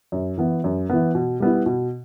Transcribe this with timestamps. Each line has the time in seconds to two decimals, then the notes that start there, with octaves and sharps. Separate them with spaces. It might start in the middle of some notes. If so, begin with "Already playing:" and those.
0.12 F#2
0.38 E3 B3
0.64 F#2
0.90 E3 B3
1.15 B2
1.40 G3 B3 E4
1.66 B2